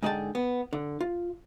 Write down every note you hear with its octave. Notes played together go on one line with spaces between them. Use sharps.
G#2 D3 G#4 D#5 G5 A5
B3
D3
F4